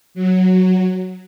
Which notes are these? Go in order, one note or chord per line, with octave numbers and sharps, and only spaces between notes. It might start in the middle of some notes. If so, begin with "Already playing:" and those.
F#3